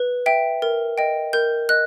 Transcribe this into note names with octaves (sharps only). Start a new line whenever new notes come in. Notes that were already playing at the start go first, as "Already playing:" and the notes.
Already playing: B4
E5 G5
A#4
D#5 G5
A#4 G6
D#5 F#6